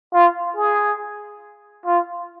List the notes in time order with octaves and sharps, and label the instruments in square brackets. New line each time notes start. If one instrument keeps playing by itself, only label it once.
[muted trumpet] F4
G#4
F4